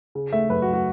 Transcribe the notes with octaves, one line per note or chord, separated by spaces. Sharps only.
C#3
A3 E5
F#2 B4
F#4
F#2
F#4